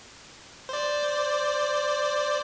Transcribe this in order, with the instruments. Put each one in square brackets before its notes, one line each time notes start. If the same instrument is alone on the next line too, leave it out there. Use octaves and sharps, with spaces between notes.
[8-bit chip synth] C5 D5